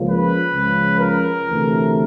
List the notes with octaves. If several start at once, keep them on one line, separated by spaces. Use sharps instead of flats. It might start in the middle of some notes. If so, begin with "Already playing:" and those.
Already playing: C#2 C#3 F3 A#3
B4
C#2 C#3 F3
A#4
D2 C3 E3 A3